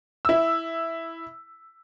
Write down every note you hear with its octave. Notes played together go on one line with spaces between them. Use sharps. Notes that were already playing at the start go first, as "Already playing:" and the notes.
E4 E6